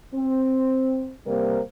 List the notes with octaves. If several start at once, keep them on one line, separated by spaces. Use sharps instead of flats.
C4
C3 G3 A#3 A#4 C5